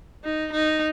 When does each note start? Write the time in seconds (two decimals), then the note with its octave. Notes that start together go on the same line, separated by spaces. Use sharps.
0.24 D#4
0.52 D#4